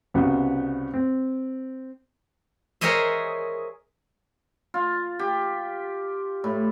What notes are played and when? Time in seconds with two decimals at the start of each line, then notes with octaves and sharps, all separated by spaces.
0.14 C2 C#3 B3 F#4
0.94 C4
2.81 G#4 A#4 C5 C#5 D#5 E5
4.74 F4
5.19 G4
6.44 A2